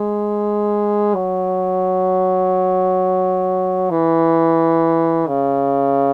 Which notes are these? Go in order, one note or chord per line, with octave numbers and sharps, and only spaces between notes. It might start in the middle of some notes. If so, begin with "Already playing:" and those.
Already playing: G#3
F#3
E3
C#3